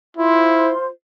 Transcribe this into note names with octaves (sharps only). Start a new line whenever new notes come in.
E4 F4 C5 C6